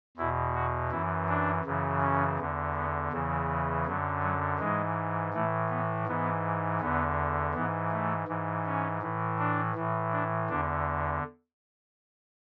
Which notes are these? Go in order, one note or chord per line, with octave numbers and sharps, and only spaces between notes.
E2 B2 E4
F#4
F#2 E3 E4
D4
F#2 C#3 E3
C#4
E2 D3
B3
E2 C#3 E3
F#2 D3 F#3
F#3
G#2 E3 G#3
A2 E3 A3
B3
G#2 E3 B3
E2 D3 B3
G#2 E3 B3
A3
G#2 E3
C#4
A2 E3
D4
A2 E3
D4
E2 D3 D4